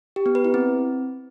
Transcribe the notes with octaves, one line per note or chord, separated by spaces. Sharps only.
G4
B3
B4
E4
C4